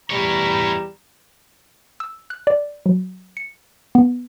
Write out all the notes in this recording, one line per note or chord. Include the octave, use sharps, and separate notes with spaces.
E2 G3 E4 C#5 A#5
E6
F#6
D5
F#3
C#7
B3